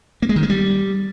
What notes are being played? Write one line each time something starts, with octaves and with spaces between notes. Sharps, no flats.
A#3
G#3
D#3
G#3
G3